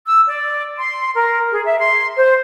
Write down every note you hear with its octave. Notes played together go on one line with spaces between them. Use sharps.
E6
D5
C6
A#4
G#4
E5
C6
C5